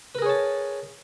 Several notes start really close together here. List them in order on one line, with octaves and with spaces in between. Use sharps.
B4 A#4 G#4 C#5 A5